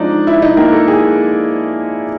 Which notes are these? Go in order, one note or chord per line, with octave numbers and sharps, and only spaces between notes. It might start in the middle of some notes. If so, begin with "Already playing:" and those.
Already playing: F3 G#3 C4 D4 D#4 D5 D#5
E4 E5
D#4 D#5
A#3 A#4
A4
G#4